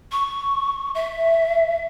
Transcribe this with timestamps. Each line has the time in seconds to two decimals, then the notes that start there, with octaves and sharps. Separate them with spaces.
0.12 C#6
0.95 E5